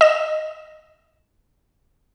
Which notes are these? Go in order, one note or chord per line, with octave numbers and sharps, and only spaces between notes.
D#5 E7